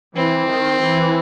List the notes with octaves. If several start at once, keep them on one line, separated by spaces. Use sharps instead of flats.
E3 C4
D#3
E3